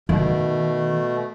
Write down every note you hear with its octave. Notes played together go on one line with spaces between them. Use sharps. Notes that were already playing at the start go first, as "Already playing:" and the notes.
B2 D#3 A3